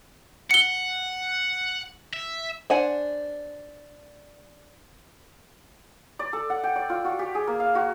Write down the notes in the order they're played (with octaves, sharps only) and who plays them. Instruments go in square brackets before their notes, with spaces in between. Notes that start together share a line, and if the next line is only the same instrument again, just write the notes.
[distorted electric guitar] F#5 [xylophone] C#7 G7
[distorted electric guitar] E5
[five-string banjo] D4 C5 F#5 G#5
[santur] D5
A4
F#5
G5
D5
F4
F#4
G4
G#4
A#3
F5
F#4